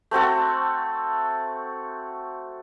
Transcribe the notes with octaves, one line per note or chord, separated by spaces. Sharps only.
A3 C4 F#4 A4